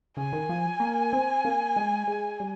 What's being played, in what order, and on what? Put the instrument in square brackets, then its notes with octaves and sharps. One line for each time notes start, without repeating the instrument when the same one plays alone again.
[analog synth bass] C#3 [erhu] G#5
[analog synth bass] D#3
F3
A#3
C4
A#3
G#3
G#3
G3